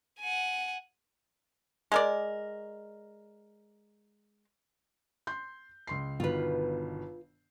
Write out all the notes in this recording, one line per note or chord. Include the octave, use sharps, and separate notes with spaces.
F#5 G#5
G#3 A#4 D5
C6 G6
C#2 C6 C7
G1 B2 D#3 F4 B4